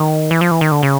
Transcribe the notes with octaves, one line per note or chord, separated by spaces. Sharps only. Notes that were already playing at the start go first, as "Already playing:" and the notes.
Already playing: D#3
E3
F3
E3
D#3
D3
C#3